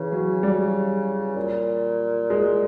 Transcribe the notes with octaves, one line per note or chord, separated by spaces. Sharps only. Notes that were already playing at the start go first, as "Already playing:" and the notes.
Already playing: C#3 E3
F#3
G3
A#2
G#3